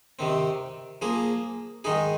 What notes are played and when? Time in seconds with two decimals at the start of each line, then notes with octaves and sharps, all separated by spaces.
0.19 C3 D#3 C4
1.02 F3 A#3 G#4
1.84 D#3 G#3 D#4 G#4